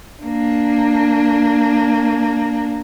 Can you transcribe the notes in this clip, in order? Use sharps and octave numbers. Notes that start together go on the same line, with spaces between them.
A#3 D4